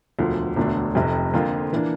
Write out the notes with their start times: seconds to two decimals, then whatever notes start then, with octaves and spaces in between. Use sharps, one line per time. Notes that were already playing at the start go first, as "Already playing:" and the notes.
0.19 E1 D2 D3 F3
0.56 E1 D2 D3 A3 D4
0.95 F1 F2 C3
1.34 F2 D3 F3 A#3 F4
1.73 E3 A#3 D4